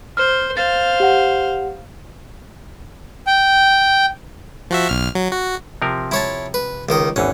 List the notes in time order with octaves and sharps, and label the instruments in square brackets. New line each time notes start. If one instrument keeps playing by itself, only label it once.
[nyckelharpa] C5 [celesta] F6
[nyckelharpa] C5 F5 [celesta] A6
[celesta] G4 F#5
[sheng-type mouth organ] G5
[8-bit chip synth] F3 F#4 E5
B1 F6
F#3
F#4
[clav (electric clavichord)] C3 F3 A#4
[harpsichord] E4 C#5 A5
B4
C#2 D#3 D#5
[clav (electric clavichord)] G#1 E2 E3 [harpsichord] C#4